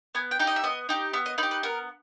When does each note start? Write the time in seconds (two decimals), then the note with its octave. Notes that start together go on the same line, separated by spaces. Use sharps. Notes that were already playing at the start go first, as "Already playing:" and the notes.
0.15 B3 G#5
0.31 G5
0.39 D#4 G4
0.47 D#5
0.56 E5
0.64 B3 D#5
0.89 D#4 G4
1.13 B3 E5
1.26 D#5
1.38 D#4 B4
1.43 G4
1.51 B4
1.63 B3 A#4